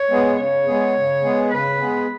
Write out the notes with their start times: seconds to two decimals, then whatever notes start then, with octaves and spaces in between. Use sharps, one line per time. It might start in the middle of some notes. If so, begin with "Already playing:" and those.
Already playing: C#5
0.09 G#3 B3 G#4
0.37 C#3 C#5
0.66 G#3 B3 G#4
0.94 C#3
1.22 G#3 B3 G#4
1.51 C#3 B4
1.78 G#3 B3 G#4